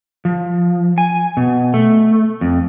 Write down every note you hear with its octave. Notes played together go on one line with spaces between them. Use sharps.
F3
G#5
B2
A3
F2